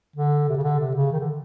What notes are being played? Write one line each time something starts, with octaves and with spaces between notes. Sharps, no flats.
D3
C3
C#3
D3
C3
C#3
D#3
D3